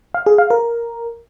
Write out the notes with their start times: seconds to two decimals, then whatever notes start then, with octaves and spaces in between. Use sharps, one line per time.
0.14 F5
0.26 G#4
0.38 F5
0.50 A#4